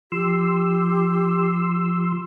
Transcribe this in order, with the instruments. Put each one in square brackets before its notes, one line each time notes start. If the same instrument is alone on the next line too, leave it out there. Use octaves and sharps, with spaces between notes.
[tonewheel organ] F3 C6 E6 [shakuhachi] G4